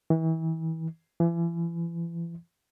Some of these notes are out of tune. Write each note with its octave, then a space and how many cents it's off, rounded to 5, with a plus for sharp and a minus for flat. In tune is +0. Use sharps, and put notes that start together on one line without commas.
E3 -35
E3 +35